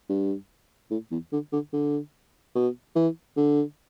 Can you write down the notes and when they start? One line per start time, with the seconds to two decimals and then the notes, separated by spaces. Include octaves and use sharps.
0.09 G2
0.91 A2
1.11 E2
1.32 D3
1.53 D3
1.73 D3
2.55 B2
2.96 E3
3.37 D3